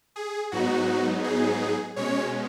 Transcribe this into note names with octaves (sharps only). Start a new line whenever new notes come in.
G#4
G#2 F#3 B3 D#4 F#4
G#4
B2 G#3 C#4 C#5